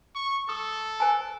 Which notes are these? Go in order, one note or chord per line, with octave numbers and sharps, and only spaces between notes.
C#6
A4 D#6
C5 G#5 A5